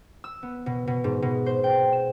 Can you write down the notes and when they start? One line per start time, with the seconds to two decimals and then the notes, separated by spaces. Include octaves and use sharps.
0.24 E6
0.43 B3
0.66 B2
0.87 B2
1.04 G#2
1.22 B2
1.46 C5
1.64 G5
1.93 E7